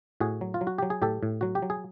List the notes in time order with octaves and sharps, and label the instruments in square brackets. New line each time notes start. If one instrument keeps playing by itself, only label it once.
[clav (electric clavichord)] A2 F#4 G#4
F#3
F4
F#3
F#4
F#3 G4
G#4
A2 G4 A4
A2
F#3 F#4
G4
F#3
G#4